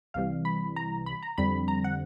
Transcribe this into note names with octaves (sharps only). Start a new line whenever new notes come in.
C2 C3 E3 G3 F5
B5
A#5
B5
A#5
F2 D3 G3 C4 B5
A#5
F#5